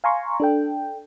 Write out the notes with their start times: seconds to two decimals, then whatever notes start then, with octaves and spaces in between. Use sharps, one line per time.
0.04 F5 G#5 A#5 C6 C#6
0.40 D4 A4 G5